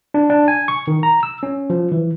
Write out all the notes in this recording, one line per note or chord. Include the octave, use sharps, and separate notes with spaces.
D4
D4
G#5
C#6
D#3
A#5
E6
C#4
F3
E3